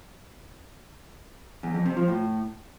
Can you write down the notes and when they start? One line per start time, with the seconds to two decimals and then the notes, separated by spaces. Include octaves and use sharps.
1.63 E2
1.74 F2
1.86 C3
1.97 F3
2.08 A2